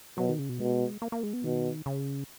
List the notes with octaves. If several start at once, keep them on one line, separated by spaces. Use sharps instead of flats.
B2 F#3
D#3
C#3
B2
B2 G#3
A#3
A#3
G#3
B3
B2 D#3
C#3